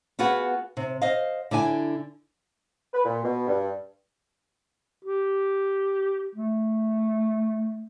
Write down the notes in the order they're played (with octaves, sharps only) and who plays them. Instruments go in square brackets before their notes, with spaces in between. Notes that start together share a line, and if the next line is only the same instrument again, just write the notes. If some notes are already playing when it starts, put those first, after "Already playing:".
[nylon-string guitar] B3 F4 F#4 G#4 B4
C3
C5 D#5 F5
D3 D4 E4 G#5
[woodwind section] B4
A#2
B2
G2
[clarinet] G4
A3